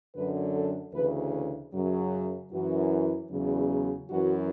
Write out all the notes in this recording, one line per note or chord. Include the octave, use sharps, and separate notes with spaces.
F#2 D3 F#3 B4
A4
D2 C#3 E3 B4
F#2 C#3 F#3
F#2 E3 F#4
E2 C#3 F#3
F#2 E3 F#4